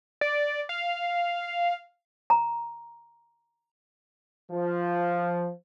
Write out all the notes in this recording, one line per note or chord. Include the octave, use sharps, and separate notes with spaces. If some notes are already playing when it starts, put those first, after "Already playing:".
D5
F5
A#5
F3